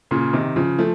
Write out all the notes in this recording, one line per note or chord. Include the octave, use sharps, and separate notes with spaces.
A#2 C#3
C3 D#3
C#3 F3
F3 A3